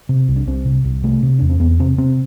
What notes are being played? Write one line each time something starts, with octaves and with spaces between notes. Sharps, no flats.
C3
C2
D4
C2 C4
C3
C2
C3 A3
C3
E2 D4
C4
E2 B3
C3 C4
C3 C4